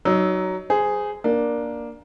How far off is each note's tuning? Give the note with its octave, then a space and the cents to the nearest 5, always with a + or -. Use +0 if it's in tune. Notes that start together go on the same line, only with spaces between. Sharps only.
F#3 +15 D#4 +0
G#4 +0 C5 -25
A#3 +10 D4 +0